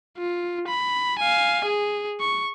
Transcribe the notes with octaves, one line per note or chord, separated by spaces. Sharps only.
F4
B5
F5 G#5
G#4
C#6